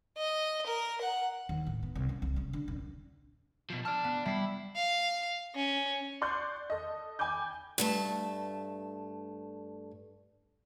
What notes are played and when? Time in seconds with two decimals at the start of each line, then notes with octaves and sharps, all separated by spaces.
0.17 D#5
0.66 A#4
1.01 F#5
1.49 D#2
1.66 A2
1.83 B3
1.96 C2
2.09 C#3
2.22 C2
2.36 C#3
2.53 D3
2.68 D#1
3.70 B2 F3
3.85 D5 A5 F6
4.04 B3
4.26 G3 E4 C7
4.76 F5
5.55 C#4
6.22 D5 C6 C#6 F#6 G6
6.70 A4 D#5
7.19 G5 G#5 B5 D6 G6
7.78 G2 A3 A5